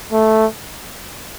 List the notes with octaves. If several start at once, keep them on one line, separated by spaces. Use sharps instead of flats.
A3